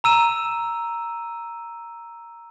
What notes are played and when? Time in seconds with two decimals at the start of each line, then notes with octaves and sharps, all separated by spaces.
0.04 A#5 E6 D#7 E7